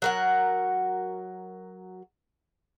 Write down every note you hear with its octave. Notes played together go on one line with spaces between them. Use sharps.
F#3 A#4 F#5